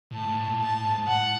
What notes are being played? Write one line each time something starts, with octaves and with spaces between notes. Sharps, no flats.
A2 A5
G#2
A2
A#2
A2 A5
G#2
G#2
A2 F#5